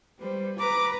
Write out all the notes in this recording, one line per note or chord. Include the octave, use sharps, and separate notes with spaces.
G3 B4 C5
B4 A#5 D6